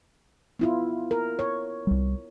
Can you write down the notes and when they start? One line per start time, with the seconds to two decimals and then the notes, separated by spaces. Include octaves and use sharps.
0.59 B3 E4 F4
1.11 A#4
1.39 C#5
1.87 C2 G3